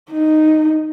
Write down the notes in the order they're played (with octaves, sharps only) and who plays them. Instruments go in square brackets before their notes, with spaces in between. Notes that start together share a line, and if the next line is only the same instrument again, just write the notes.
[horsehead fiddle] D#4